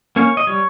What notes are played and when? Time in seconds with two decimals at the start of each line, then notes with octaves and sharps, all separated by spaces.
0.16 A#3 C#4 C#5
0.37 D#5
0.47 G3 C#5